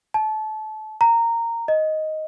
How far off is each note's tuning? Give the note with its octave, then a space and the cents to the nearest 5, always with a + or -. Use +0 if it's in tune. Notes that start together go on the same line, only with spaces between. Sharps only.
A5 -25
A#5 -15
D#5 +5